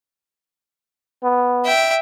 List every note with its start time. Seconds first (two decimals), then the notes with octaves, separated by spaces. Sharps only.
1.23 B3
1.66 E5 G5